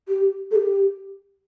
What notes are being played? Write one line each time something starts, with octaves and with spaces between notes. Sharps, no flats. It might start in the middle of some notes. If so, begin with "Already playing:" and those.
G4
A4
G4